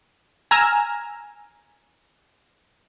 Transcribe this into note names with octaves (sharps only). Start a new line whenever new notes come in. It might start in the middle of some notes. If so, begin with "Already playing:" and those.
G#5 A#5 E6 F6